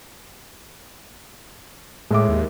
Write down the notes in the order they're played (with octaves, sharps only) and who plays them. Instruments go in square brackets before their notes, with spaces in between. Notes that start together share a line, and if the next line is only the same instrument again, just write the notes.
[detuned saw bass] A2 [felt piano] G#3 E5 D6
[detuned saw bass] D#2